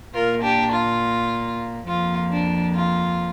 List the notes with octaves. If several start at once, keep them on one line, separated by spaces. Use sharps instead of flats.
A#2 A#3 F4 A#4
D4 G4
F4
F2 F3 A#3 F4
D4
F4